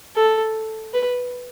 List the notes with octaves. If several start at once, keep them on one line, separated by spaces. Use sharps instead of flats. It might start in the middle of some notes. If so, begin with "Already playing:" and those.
A4
B4